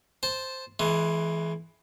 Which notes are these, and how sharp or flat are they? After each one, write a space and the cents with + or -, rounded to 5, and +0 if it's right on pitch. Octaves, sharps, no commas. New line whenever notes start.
C5 +0 A5 -10
E3 +0 G#3 +30